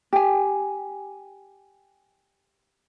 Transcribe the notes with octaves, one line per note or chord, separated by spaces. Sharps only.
G4 G#5